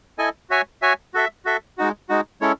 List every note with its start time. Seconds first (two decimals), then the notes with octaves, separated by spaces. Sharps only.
0.18 E4 A4 D#5 G#5
0.50 F#4 C#5 E5 G#5
0.82 F#4 C#5 E5 G#5
1.14 F#4 A4 E5
1.45 F#4 A4 E5
1.78 G#3 D#4 F#4
2.09 G#3 D#4 F#4
2.41 G#3 C#4 E4 A4 C#5